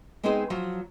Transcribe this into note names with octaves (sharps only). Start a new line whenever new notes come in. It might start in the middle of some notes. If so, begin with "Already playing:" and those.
G#3 B3 C4 D#4 G#4 C5
F3 F#3